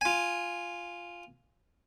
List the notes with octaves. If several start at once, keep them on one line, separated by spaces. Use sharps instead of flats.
F4 G#5